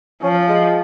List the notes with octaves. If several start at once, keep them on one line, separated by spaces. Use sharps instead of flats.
F3 C#4
G#3